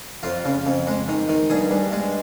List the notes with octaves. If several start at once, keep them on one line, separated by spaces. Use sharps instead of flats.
F2 F4
C#3
F2
G#3
D#3
D#3
G2 G#4
G2
G#3